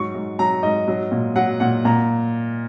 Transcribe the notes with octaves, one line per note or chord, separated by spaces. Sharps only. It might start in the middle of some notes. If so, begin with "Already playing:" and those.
Already playing: G#2 F#3 C#6
G#2
F#3 A#5
G#2 D#5
F#3
A#2
F#3 F#5
A#2 F#5
A#2 A#5